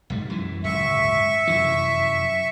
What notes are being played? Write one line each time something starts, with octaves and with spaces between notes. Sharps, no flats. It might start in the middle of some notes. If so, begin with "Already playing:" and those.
B1 G#2 G3
F#2 E3
D1 G1 C#2 E5 C#6
F1 F#2 E3